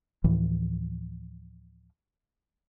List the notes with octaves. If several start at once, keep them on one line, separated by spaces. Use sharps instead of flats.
D2 A2 E3 F3